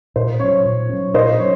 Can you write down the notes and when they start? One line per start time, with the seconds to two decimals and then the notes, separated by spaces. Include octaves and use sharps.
0.16 A#2 C5
0.40 F#3 C#4 C#5
0.65 A#2
0.89 F#3 C#4
1.14 A#2 C5 D#5
1.39 F#3 C#4 C#5